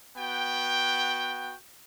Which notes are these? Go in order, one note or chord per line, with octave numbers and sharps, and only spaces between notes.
B3 F#4 G5